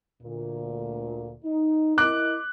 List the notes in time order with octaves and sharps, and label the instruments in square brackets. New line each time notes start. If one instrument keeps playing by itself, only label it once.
[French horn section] D2 A#2
D#4
[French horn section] E4 A#4 D#5 [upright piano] D6 F#6